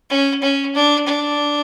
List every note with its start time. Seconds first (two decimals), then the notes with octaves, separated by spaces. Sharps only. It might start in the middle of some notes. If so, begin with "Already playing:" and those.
0.10 C#4
0.42 C#4
0.75 D4
1.07 D4